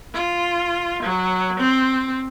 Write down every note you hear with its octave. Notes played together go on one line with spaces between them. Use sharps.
F4
F#3
C4